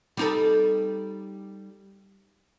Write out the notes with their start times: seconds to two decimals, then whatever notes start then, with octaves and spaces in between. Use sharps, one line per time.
0.17 G3 D#4 A4